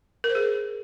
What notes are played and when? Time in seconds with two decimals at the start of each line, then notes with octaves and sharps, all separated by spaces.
0.24 A#4
0.30 C5
0.35 G#4